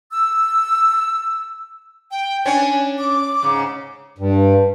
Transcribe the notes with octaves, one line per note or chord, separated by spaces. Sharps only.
E6
G5
C#4 D4 C#5 G#5
D6
G#2 C#3
G2